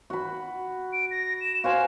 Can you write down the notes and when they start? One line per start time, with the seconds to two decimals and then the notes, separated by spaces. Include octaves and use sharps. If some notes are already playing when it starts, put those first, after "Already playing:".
0.10 F#4 B5
0.93 D7
1.11 A#6
1.41 E7
1.64 F#4 C5 F5 G#5